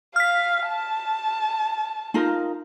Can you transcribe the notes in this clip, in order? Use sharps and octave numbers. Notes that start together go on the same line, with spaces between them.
F5 F6 B6
A5
D#4 F4 A#4